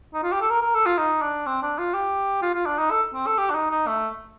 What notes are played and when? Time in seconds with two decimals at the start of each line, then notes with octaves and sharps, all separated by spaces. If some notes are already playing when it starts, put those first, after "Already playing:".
0.14 D#4
0.23 F4
0.32 G4
0.41 A4
0.50 A#4
0.62 A#4
0.75 A4
0.86 F4
0.98 D#4
1.22 D4
1.47 C4
1.62 D4
1.79 F4
1.94 G4
2.42 F4
2.55 F4
2.66 D4
2.79 D#4
2.91 A4
3.14 C4
3.27 A4
3.38 G4
3.50 D4
3.55 D#4
3.71 D#4
3.87 A3